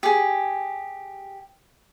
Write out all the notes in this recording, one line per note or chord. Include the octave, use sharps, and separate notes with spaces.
G4 G#4